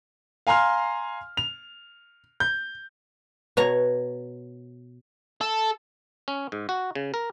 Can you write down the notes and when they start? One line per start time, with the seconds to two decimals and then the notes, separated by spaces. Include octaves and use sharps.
0.47 F5 G#5 A#5 C6 F6
1.37 F7
2.40 G6
3.57 B2 C#5 A#5
5.41 A4
6.28 C#4
6.52 G#2
6.69 F#4
6.95 C#3
7.14 A#4